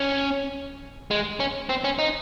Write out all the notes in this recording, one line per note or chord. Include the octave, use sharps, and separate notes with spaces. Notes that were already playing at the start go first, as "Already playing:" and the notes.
Already playing: C#4
G#3
C#4
C4
C#4
D#4